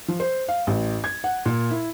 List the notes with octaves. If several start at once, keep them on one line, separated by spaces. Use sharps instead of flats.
F3
C5
F5
A1
G#6
F#5
A#2
E4